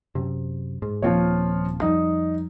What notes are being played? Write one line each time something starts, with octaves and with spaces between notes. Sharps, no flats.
F#2 C3
G#2
D#1 F3 A#3 C4 F4 C#5
F2 G3 D#4